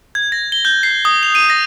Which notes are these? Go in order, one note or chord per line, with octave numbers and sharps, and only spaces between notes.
G#6
A#6
G7
G6
C7
D#6
F7
D#7
A#6